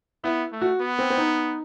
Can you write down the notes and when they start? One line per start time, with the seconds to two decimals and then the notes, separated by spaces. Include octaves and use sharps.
0.24 B3 E4
0.52 A3
0.61 F#4
0.80 B3
0.99 C4
1.10 C4
1.17 D#4